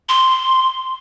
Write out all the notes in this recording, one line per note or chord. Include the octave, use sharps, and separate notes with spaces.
C6